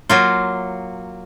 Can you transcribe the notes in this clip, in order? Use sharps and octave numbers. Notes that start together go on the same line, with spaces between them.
F#3 A#3 F4